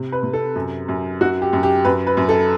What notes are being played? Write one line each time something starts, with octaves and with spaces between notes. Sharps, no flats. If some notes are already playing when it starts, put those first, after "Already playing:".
Already playing: C3
B4
C3
A4
F#2
F#2
F#2 F#4
G4
F#2
G4
F#2 B4
B4
F#2
A4